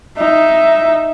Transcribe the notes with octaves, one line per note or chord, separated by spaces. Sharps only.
D#4 E5